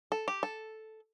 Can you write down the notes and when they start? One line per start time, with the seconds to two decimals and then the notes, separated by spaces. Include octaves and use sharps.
0.12 A4
0.28 G4
0.43 A4